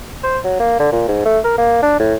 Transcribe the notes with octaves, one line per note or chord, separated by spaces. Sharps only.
C5
F#3
A#3
D3
A#2
G#2
A3
A#4
A#3
D4
A2